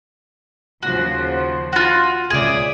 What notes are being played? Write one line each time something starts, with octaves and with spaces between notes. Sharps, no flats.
D#2 C#3 F3 F#4
F4 F#4
C#2 G#4 D5 E5 D#6